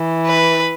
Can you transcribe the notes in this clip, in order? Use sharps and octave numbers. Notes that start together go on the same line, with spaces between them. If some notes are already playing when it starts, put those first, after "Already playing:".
Already playing: E3
B4